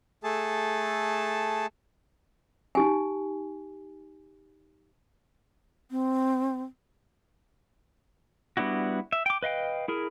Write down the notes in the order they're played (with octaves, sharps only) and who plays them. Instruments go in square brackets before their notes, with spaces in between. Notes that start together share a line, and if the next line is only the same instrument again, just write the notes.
[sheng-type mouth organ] A3 G#4 A4 A5
[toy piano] D#4 G4 G#5
[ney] C4
[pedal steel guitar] G3 B3 D4 E4 F#4
E5
G5 D6
B4 D#5 F5 G5
E4 G#4 A#4